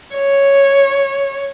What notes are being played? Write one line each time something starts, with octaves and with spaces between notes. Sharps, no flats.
C#5